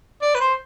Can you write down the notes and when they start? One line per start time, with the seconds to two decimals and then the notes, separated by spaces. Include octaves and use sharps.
0.22 D5
0.35 B4
0.41 C5